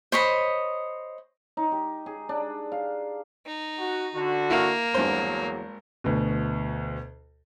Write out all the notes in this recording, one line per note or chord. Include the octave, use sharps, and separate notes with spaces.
C5 C#5 D#5 B5
D#4
G4
G#4
D4
F5
D#4
F#4
D3 F#4
A#3 E4 F5
G#1 E2 G2 F#3 C5
D2 B2